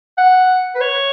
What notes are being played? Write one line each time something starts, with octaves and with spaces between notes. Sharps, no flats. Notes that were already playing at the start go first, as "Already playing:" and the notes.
F#5
B4
C#5